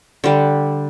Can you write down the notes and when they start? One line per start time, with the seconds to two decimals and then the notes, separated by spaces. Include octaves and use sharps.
0.24 D3 G3